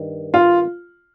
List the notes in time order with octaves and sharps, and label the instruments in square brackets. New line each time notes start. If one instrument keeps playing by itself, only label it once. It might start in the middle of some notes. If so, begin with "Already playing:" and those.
Already playing: [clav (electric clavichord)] G2 D#3
[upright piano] F4